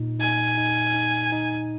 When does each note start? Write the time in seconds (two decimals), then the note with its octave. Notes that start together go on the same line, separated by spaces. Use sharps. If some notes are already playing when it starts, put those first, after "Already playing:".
Already playing: A#2 D#4
0.19 D#4 G#5
0.57 D#4
0.94 D#4
1.32 D#4